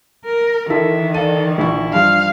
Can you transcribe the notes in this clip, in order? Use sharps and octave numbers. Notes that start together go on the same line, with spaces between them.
A#4
D#3 E3 E4 A4 A#4 E5
A4 D5 F5 D#7
A#1 E4 C#6
G2 F3 G3 F5